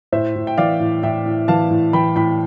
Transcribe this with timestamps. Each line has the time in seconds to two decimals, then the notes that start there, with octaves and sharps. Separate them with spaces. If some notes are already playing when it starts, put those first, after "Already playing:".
0.12 A2 C5 E5
0.36 A2
0.47 G5
0.58 E3 D5 F5
0.80 A2
1.03 A2 E5 G5
1.26 A2
1.48 E3 F5 A5
1.71 A2
1.93 E3 G5 B5
2.16 A2 G5 B5